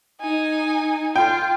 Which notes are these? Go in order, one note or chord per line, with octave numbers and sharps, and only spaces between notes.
D#4 G#5
F4 G5